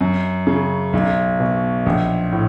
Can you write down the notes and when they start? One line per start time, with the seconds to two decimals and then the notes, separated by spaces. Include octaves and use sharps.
0.01 F#2
0.47 C#3
0.93 B1
1.40 B2
1.86 A#1
2.32 A2